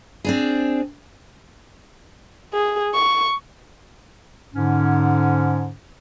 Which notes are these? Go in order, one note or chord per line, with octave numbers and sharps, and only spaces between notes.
C4 D4 G#4
G#4
C#6
G#2 D3 C#4